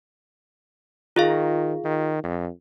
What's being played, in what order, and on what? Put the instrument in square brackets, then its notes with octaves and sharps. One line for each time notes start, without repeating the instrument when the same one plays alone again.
[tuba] D#3 [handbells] F4 G#4 F5
[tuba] D#3
F2